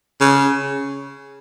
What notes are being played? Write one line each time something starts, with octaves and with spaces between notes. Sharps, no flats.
C#3